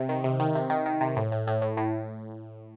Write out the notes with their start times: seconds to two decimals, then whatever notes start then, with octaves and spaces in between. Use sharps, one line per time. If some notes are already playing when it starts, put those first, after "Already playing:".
Already playing: C3
0.09 D#3
0.24 C3
0.40 D#3
0.55 C3
0.70 D#3
0.86 D#3
1.01 C3
1.17 A2
1.32 A2
1.47 A2
1.62 A2
1.77 A2